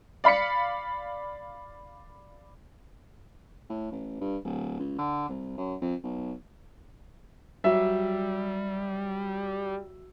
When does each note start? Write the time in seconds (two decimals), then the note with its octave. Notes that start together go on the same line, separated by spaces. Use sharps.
0.24 D5 F5 B5 B6 C#7
3.69 A2
3.91 A1
4.20 G2
4.44 D1
4.79 C#2
4.98 D3
5.29 C2
5.57 F#2
5.82 F2
6.04 B1
7.64 F#3 G3 E5